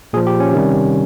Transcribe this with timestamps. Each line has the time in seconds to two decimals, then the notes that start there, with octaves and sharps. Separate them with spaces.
0.13 A#2 G#4
0.17 F3
0.27 G4
0.40 C#4
0.53 C3 D#3 G3